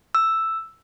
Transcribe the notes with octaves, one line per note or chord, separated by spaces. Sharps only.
E6